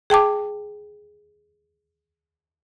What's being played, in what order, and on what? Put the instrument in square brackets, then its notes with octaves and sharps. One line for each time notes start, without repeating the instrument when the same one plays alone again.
[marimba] G#4 G5 A5 D6